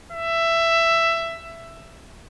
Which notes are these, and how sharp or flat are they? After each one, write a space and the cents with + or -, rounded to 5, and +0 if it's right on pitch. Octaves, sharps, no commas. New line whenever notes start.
E5 +15